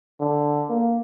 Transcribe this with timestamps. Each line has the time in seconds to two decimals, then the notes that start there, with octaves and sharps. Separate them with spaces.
0.20 D3
0.69 A#3